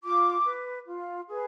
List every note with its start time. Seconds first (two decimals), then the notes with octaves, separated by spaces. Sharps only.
0.03 F4 D6
0.45 B4
0.87 F4
1.28 G#4 B4